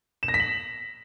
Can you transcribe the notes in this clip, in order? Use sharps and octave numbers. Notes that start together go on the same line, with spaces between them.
E7
A#6
B6
F#7